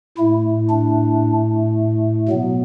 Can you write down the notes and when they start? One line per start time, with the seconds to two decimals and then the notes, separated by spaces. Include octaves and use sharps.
0.18 A2 A3 E4
0.70 D4
2.28 B2 F#3 B3